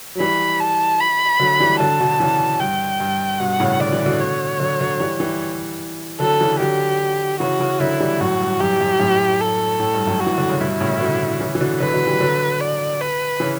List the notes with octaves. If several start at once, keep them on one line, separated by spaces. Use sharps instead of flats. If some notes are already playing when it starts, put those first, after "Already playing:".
F#3
E3 G3 B5
A5
B5
D3 F#3
E3 G3
D3 F#3 A5
B2 D3
C#3 E3
G2 G5
G2
G2 B2 F#5
A2 C#3
D3 D5
E3
B2 D3
C#5
D3 F#3
D3 F#3
E3 G3
E3 G3
D3 F#3 A4
C#3 E3
D3 F#3 G4
C#3 E3 F#4
C#3 E3
D3 F#3 E4
E3 G3
F#2 A2 F#4
G2
F#2 G4
F#2
F#2 A2
A4
A2
G2
F#2 A2
F#4
E3
D3
C#3
G2 B2 E4
A2 C#3
C#3
B2 D3
C#3 E3
E3
B2 D3
D3 F#3 B4
D3 F#3
E3 G3
D3 F#3
D5
B4
C#3 E3